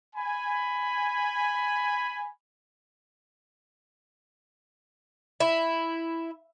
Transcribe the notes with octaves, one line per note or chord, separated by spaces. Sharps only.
G#5 B5
E4